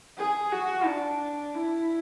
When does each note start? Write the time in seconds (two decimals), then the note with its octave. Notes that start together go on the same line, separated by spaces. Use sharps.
0.18 G#4
0.52 F#4
0.86 D4
1.55 E4